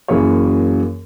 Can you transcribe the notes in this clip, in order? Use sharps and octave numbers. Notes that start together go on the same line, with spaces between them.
F#2 E3 F#3 A#3 G#4 C#5